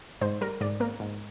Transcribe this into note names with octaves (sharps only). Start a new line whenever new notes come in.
G#2 C5
G3 A#4
G#2 D5
A#3 A#4
G#2